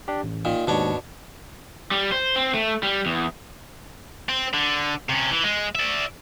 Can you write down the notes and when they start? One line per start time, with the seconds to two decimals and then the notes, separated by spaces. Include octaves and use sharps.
0.08 D4 G4
0.23 A1
0.45 A#2 D#3
0.67 D#2 G#2 B2 D4 C#5
1.91 G3
2.12 C5
2.36 C4
2.54 A3
2.83 G3
3.06 E2
4.29 C4
4.54 D3
5.10 C3 C#4
5.31 E3
5.44 G#3
5.75 D5 E5